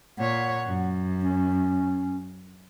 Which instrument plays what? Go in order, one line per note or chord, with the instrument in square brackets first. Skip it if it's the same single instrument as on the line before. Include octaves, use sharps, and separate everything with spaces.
[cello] A#2 C#5 [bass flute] F#5
[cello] F#2
[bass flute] C#4